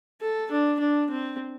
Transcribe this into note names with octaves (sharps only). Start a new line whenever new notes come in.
A4
D4
D4
C4